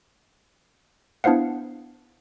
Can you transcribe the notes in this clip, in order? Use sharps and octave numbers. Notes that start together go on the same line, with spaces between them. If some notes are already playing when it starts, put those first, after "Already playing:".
B3 D4 E4 C5 F5 F#5